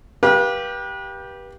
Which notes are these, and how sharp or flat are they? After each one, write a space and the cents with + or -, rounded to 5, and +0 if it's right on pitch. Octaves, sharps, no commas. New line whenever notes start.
G4 +0 B4 -35 F5 +5